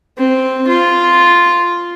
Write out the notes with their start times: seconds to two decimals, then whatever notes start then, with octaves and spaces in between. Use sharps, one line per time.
0.18 C4
0.68 F4